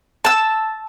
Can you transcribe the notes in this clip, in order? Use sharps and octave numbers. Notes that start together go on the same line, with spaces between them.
A5 E6